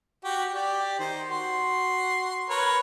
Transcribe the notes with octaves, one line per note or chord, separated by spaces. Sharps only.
F#4 G4
G4 D5
D#3 C5
F#4 C6
A#4 B4 C#5